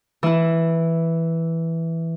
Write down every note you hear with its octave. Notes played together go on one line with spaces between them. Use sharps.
E3 E4